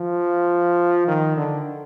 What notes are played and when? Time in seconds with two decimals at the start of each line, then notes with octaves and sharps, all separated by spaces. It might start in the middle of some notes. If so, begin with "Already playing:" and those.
Already playing: F3
1.07 D#3
1.37 D3